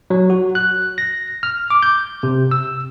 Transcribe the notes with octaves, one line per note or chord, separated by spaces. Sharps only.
F#3
F#4
F#6
A#6
F6
D6
G6
C3
E6